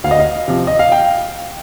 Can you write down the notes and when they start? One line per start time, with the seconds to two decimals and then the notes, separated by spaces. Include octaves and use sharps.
0.04 D2 F5
0.11 D#5
0.20 F5
0.48 C3 F3
0.67 D#5
0.79 F5
0.92 G5